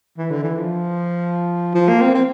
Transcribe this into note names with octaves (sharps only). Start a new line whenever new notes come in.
E3
D3
E3
F3
F3
A#3
C4
C4